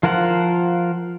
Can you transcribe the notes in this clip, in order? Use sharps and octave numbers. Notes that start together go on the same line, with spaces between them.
F3 F4 A#4 C5 F#5